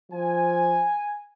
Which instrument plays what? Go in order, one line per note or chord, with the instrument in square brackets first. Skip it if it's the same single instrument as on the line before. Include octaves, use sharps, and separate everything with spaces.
[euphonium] F3 [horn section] G#5